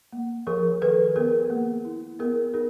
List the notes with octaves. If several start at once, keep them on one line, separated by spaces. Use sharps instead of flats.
A#3
F3 G#4 A#4
D#3 A4 B4
B3 G#4 A#4
A#3
E4
B3 G#4 A#4
D#4 G#4 A#4